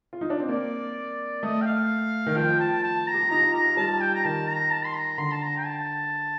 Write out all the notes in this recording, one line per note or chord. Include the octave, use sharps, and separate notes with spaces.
F4
D#4
D4
C4
A#3 D5
A3 D#5
G5
F5
D#3
F3 G5
A5
A5
A#5
G4
F4
D#4 A#5
F4
G4 A#5
F4
G3 A5
G5
A#5
D#3 A5
A#5
A5
C6
A#5
D3 C6
A5
A#5
G5
A5